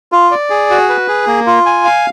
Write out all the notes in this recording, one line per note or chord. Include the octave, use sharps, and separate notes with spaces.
F4
D5
G#4
F#4
B4
G#4
A#3
F4
G#5
F5